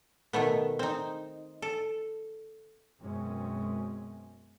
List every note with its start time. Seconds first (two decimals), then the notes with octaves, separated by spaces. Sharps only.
0.33 B2 D#3 A3 B3
0.79 C4 D#4
1.62 A4
3.02 F#2 B2 G#3 C4 C#4